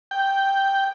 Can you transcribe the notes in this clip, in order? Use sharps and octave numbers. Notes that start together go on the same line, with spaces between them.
G5